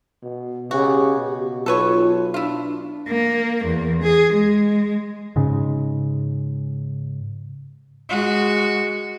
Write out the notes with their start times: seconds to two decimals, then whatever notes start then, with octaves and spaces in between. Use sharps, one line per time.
0.23 B2
0.71 C#3 F#4 G4
1.17 B2
1.66 B1 F4 A4 B4 C#5
2.34 D4 E4 F4
3.09 A#3
3.65 E2
4.02 G#4
4.33 G#3
5.36 G#2 C#3
8.09 G#3 F#4